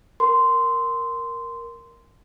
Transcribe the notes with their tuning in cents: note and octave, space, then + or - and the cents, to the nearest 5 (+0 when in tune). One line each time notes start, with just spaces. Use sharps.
A#4 +0 C6 -15